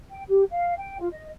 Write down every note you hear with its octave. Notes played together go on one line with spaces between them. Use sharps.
G5
G4
F5
G5
F4
D#5